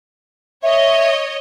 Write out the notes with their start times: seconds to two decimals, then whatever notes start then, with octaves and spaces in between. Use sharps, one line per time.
0.63 C#5 D#5 E5